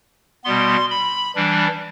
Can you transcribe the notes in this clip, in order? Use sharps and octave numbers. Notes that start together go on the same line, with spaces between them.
B2 G3 B3 C6
B5
E3 G3 D4